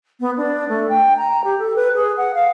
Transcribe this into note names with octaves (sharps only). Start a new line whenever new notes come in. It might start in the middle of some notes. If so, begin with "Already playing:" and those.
B3
D4
A3
G5
A#5
G4
A4
B4
G#4
F#5
F5